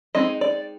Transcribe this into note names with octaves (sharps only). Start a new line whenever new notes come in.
G#3 C4 D#4 D#5
D5